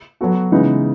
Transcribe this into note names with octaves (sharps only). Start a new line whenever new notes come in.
F#3 B3 F#4 A4
C#3 E3 G#3 B3 D#4